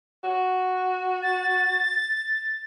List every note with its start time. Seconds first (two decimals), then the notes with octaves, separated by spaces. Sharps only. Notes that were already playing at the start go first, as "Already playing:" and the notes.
0.24 F#4
1.23 A6